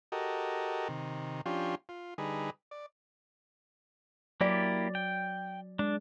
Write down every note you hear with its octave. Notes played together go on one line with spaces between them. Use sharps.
F#4 G4 A4 A#4 D#5
C3 D#3
F3 C#4 D4 F4 G4
F4
D3 G3 D#4 G#4 B4
D5
F#3 A#3 E4 G4 D5
G5
G#3 D4